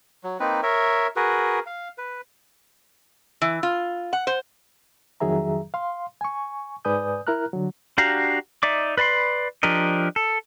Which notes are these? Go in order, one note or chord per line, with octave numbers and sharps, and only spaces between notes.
F#3
A#3 C4 D#4 B4
A#4 C#5 E5
F#4 G#4 A#4 B4
F5
B4
E3
F4
F#5
C5
F2 D#3 F#3 G#4 E5 A#5
F5 C6
G#5 C#6
G#2 B4 D5 G#5 D#6 G6
E4 A#4 A#5 F6 F#6
D3 F#3
D4 F#4 G4 F5 A#5
D#4 D5 E5 D6
B4 D5 B5 C6
F3 D4 G4 A#4 D#5
A4